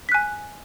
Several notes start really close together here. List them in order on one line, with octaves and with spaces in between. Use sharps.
B6 F#6 G#5